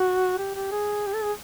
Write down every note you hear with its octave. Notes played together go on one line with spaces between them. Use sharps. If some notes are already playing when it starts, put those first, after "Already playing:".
Already playing: F#4
G4
G4
G#4
G4
A4
G#4